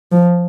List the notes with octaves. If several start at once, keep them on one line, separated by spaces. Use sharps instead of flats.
F3